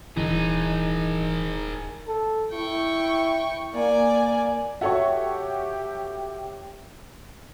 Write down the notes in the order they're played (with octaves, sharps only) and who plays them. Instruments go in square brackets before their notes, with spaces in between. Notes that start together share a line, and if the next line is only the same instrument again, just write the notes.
[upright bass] D#1 [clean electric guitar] E3 [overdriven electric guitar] D#4 [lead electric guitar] G#4 A#4
[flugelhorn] A4
[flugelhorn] E4 [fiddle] G5 C#6
[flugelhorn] A#3 [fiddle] D5 G#5
[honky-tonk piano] F#4 A4 C#5 [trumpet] G4 [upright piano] E5 G5 C#6